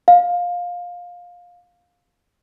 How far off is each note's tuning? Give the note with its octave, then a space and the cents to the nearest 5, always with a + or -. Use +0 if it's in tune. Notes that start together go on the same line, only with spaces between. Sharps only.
F5 +15